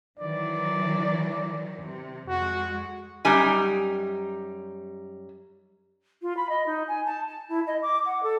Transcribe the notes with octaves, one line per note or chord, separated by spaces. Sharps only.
D#3 E3 F#3 D5
C3
F2 G#3 F#4
F#2 G3 D#4 G#5
F4
B5
D#5
D#4
G#5
A5
A5
E4
D#5
D6
F#5
A4